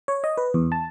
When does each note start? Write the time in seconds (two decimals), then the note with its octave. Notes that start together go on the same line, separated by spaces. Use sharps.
0.08 C#5
0.24 D#5
0.37 B4
0.54 E2
0.72 A5